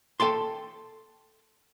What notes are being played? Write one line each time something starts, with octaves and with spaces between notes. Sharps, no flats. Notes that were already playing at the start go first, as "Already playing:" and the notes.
A4 G5 A5 C6